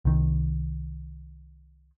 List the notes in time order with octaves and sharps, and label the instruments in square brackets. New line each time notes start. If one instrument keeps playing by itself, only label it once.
[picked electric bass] C2 D#3